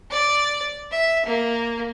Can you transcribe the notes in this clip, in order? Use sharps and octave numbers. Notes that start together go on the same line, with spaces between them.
D5
E5
A#3